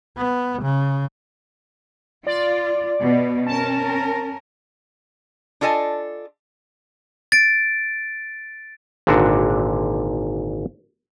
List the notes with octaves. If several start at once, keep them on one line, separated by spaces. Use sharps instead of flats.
B3
C#3
F4 D5
B2 B3
C#4 A#4 A5
D4 F4 A4 D#5 G#5
A6 D7
G#1 A#2 D3 D4 F#4